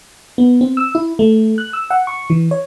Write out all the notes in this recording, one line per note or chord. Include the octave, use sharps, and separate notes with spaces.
B3
C4
E6
E4
A3
F#6
E6
F#5
C#6
E3
C#5